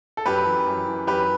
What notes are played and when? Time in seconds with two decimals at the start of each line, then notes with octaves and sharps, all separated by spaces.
0.17 A4
0.26 F#2 G4 B4
0.46 E3
0.66 F#2
0.87 E3
1.07 F#2 G4 B4